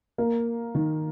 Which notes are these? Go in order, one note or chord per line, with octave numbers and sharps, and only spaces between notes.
A#3
D#3